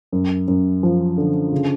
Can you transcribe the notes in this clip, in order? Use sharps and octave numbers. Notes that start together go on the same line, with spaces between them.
F#2
F#2
F3
D3
C#3